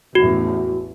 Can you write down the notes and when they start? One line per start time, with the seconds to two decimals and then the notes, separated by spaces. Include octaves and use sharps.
0.15 A1 E2 F#4